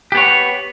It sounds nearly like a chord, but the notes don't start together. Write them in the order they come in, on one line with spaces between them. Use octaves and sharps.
G4 B3 C#5